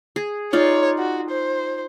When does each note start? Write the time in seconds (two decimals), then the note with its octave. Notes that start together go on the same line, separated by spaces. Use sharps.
0.16 G#4
0.53 D#4 F4 C#5 D5
0.99 F#4
1.30 C5